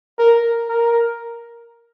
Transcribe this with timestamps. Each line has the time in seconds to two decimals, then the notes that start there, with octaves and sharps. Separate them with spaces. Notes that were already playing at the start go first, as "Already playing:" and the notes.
0.19 A#4
0.69 A#4